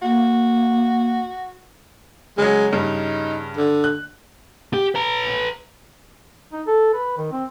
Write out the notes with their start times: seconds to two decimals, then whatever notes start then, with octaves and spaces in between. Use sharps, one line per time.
0.02 A#3 F#4
2.38 C#3 F#3 G#3
2.72 G2 C#3 D#4
3.57 D3
3.84 F#6
4.73 G4
4.95 B4 A#5
6.52 D#4
6.67 A4
6.94 B4
7.17 D#3
7.32 C4